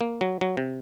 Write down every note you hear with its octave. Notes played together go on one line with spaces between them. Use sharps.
A#3
F#3
F#3
C3